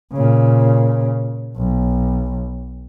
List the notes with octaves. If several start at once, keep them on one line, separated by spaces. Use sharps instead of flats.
A#2 C#3
B1